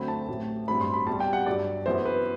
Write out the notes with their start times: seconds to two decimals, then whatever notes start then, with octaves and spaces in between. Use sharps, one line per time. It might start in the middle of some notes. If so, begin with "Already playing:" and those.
Already playing: D2 D3 F#3 C4 B5
0.08 A5
0.28 A1 A2 F#3 C4
0.68 A1 G2 F#3 C4 B5
0.81 C6
0.94 B5
1.07 C2 B2 G3 A5
1.20 G5
1.33 F#5
1.46 G1 G2 F#3 D5
1.86 F#1 F#2 E3 B3 C5
2.06 B4